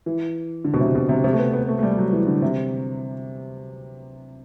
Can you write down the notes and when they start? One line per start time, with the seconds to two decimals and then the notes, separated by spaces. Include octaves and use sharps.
0.06 E3
0.65 D3
0.74 B2
0.80 C3
0.95 B2
1.09 C3
1.24 C3
1.33 A3
1.39 B3
1.53 B3
1.69 A3
1.79 A3
1.83 G3
1.98 F#3
2.13 E3
2.27 D3
2.42 C3